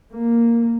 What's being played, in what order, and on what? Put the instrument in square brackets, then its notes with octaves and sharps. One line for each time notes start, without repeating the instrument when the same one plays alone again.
[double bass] A#3